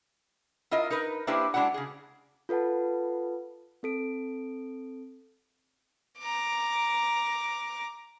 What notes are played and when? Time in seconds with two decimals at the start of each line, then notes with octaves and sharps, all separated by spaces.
0.71 E4 F4 A#4 D#5
0.90 D#4 A#4 B4
1.27 A#3 D4 E4 G4 B4 C5
1.54 G#3 D4 E4 F#4 F#5
1.74 C#3 G#4
2.49 F4 A4 B4 F#5 A5
3.83 C4 A4 D7
6.20 A#5 D6